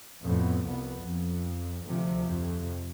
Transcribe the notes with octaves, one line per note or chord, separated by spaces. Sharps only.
F2 A2 B3
C2 F3 B3
F2
D2 C3 F3
F2 C3